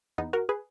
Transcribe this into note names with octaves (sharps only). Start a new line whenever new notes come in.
E2 B3 D#4
F#4 A#4
G#4 B4